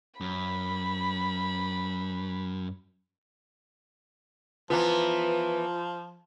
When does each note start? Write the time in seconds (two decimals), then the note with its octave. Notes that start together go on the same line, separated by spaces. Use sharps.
0.21 F#2 B5
4.70 E3 F3 B3 F4 A#5